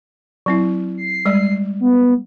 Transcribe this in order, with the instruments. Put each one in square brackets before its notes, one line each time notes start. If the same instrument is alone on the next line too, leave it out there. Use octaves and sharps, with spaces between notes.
[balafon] F#3 C4 E4
[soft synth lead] C7
[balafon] G3 G#3 D5
[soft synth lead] B3